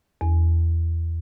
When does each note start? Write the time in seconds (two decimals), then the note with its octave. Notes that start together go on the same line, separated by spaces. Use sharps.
0.21 E2